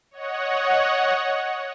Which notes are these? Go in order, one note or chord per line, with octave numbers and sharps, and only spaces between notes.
C#5 D#5 F#5